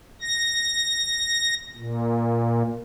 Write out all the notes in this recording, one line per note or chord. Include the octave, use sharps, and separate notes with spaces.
A#6
A#2